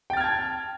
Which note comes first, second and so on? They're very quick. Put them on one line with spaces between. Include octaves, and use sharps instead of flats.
G5 A6 F6 G#6 A5